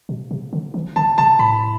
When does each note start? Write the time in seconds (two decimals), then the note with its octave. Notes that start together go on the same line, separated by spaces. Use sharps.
0.09 B2
0.31 C3
0.53 D3
0.74 E3
0.96 D3 A5
1.18 C3 A5
1.39 A2 B5